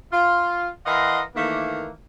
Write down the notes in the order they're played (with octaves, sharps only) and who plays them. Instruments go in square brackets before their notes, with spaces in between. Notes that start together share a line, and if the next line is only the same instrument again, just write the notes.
[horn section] F4
E3 A#4 D#5 F5 F#5 C6
D#3 E3 A3 A#3